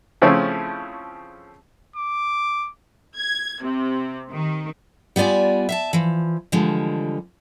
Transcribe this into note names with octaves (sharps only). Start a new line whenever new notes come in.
C#3 F3 A3 C4 C#4 E4
D6
G#6
C3
D#3
G3 B3 F4 D5 G#5
E5 F5 A5
E3 F3
D3 E3 F3 G3 G#3